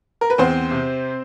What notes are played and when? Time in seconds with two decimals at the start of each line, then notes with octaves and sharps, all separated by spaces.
0.21 A#4
0.30 B4
0.38 E2 C4 C5
0.71 C3